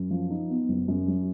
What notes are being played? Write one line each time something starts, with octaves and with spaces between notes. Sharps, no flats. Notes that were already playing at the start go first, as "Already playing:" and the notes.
Already playing: F#2
F3
D#4
B3
F#1
F#2
F#3